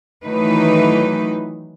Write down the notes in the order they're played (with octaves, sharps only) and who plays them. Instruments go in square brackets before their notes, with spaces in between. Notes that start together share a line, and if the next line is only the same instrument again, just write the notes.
[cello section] D#3 E3 F#3 A3 D#4 B4